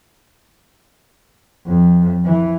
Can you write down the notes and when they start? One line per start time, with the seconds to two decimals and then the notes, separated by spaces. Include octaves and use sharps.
1.66 F2
2.24 E3